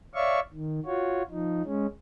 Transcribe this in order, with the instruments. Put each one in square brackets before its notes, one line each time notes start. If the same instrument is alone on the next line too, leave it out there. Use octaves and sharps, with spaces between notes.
[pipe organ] C#5 D5 E5 F5 C#6
D#3
F4 F#4 C#5
F3 D#4
G#3 C#4